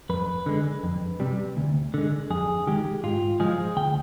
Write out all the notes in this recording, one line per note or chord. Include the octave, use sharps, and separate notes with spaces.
F2 B4
D3 G#3
F2
C3 G3
D2
D3 G#3
F2 G#4
D#3 G#3 G4
G#2 F4
F3 G#3 G#4
D2 G5